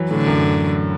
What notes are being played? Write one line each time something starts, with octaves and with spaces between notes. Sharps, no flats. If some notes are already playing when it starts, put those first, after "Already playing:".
Already playing: E3 F#3
A2 D3
F#2